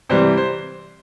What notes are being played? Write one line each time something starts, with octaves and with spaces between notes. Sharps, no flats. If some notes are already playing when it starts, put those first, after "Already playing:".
C3 E3 G3 C5
C5